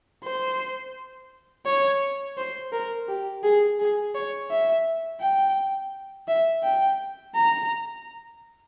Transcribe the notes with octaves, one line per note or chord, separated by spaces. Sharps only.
C5
C#5
C5
A#4
G4
G#4
G#4
C#5
E5
G5
E5
G5
A#5